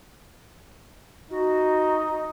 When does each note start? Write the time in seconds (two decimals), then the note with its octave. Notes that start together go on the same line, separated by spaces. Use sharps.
1.31 D#4 F#4